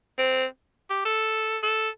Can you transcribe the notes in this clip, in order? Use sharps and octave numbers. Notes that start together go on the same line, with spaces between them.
C4
G4
A4
A4